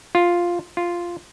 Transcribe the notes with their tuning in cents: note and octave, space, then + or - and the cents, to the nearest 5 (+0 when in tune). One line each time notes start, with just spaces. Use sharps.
F4 +0
F4 -5